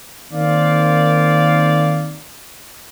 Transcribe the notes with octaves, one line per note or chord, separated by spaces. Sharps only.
D#3 A#3 C4 C5 D5 F5